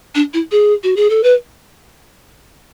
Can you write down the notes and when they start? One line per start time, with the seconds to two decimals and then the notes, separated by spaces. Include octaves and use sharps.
0.15 D4
0.34 E4
0.52 G#4
0.83 F#4
0.96 G#4
1.10 A4
1.23 B4